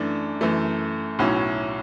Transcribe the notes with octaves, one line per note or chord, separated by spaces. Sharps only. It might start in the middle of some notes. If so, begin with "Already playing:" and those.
Already playing: F#2 E3 A3 D4
F#2 E3 A3
B1 A2 F#3 C#4 E4